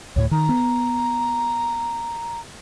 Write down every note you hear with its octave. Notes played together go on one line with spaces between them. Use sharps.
D2 A2 C#5
D#3 A#5
B3